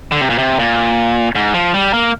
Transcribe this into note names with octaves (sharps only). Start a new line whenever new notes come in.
D3
C3
A#2
C3
A#2
G#2
F3
G3
A#3